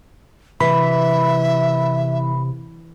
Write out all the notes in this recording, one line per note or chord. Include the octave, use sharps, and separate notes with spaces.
C3 E3 E5 B5